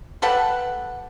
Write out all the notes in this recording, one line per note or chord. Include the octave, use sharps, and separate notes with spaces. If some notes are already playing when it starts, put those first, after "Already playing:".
G4 A4 B4 F#5